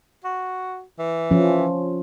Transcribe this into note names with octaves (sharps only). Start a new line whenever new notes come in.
F#4
E3
F3 C#4